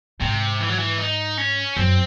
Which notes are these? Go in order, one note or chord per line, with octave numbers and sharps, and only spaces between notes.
G#2 C3
E3
F#3
E3
D#4
C#4
F#2 C4